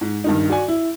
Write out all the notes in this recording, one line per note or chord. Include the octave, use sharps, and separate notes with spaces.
G#2
G2 D#3 D#4
F#4 D5 G#5
E4